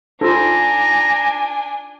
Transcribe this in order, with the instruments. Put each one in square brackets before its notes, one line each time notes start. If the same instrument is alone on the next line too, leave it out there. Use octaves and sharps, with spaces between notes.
[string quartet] D4 G#5 [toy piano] D#4 F4 [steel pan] A4 C5 [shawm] A#5